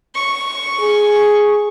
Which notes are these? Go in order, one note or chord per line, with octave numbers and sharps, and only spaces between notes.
C#6
G#4